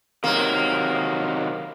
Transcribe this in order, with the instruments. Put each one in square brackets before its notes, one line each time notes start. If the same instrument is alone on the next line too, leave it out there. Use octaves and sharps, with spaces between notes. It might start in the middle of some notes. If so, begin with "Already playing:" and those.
[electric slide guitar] C3 D#3 F#3 [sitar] A#3